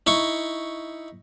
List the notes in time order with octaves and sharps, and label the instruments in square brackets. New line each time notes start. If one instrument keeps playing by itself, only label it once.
[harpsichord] D#4 E4 C#6